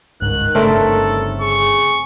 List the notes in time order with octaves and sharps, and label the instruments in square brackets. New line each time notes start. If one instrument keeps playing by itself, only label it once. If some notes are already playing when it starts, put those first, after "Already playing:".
[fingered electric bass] G1 C#2 G#2 [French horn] D#3 [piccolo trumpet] F#6
[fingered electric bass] G1 C#3 D4 [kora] A3 C4 A#4 [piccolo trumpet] A4
[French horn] G#4 [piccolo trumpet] C#6